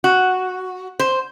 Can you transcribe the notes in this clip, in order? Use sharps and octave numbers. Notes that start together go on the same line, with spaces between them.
F#4
C5